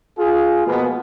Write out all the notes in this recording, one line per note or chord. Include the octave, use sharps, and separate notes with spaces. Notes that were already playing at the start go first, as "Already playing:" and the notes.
F4 G#4
B2 F3 G#3 A#3 B3